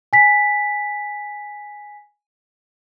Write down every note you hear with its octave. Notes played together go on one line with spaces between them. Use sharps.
G#5 B6